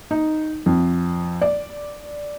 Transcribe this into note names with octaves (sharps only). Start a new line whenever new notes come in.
D#4
F2
D5